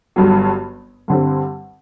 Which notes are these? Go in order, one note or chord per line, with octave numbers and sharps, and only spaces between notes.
G1 G2 F#3
G2 D3 G3 C4